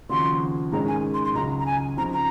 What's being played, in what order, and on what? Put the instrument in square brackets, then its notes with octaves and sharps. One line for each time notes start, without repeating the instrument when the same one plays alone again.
[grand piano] D#2 C#3 F3 C4 F#4 [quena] C6
[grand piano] G#2 D#3 G#3 C#4 G#4 [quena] A#5
[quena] G#5
C6
C6
[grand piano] C#2 C#3 F#3 [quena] A#5
[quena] A#5
G#5
[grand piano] C#3 F3 C4 D#4 [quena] A#5
[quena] A#5